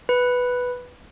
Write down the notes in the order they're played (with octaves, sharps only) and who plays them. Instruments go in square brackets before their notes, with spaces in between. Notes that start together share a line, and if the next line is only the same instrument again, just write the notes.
[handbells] B4